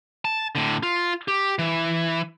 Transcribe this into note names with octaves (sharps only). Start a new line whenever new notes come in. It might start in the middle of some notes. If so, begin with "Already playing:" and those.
A5
A2 D3
F4
G4
E3